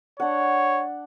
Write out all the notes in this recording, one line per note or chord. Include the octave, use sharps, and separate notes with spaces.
D4 C#5 F#5